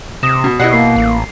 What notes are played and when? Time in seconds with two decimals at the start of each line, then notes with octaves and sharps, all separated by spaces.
0.23 C3 D#6 A#6 E7
0.44 B2
0.59 B2 E4 G4 D5 D#5 F#5 C7
0.73 A#3 C7
0.96 A1